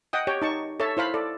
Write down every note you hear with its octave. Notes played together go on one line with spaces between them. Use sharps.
D#5 F#5 G5 D#6
G4 C#5 G5
D#4 A5 C#6
A4 C#5 E5 A5
E4 C5 F5 B5
A4 D5